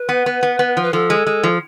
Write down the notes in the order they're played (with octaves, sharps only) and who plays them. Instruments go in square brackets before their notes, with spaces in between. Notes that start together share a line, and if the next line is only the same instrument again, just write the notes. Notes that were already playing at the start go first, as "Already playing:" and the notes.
Already playing: [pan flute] B4
[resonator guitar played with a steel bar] B3
B3
B3
B3
F3
[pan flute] B4
[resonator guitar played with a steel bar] F3 [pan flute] A4
[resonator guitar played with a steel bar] G#3
G#3
F3